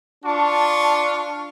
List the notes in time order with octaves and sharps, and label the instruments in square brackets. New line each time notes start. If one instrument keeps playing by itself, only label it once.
[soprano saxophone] D4 [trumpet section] F4 C#6 [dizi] A5